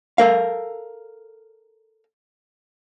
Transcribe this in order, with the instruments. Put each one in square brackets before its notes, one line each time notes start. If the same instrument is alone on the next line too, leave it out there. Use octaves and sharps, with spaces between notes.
[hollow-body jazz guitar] A4 A#4 F5